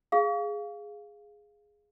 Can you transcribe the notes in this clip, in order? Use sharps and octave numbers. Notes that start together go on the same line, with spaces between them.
G#4 F5